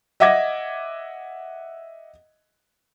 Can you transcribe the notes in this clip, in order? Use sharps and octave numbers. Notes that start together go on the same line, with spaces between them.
D#5 E5 F#5 D6 G#6 A#6